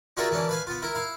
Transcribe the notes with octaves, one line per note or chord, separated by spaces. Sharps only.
D4 F4 F#4 G#4 A#4 E5
E3 A#3 C#4 D4
B4 F5 G#5
B3 F4
E4 A#4
E4 F5